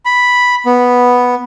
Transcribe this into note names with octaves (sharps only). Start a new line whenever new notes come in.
B5
B3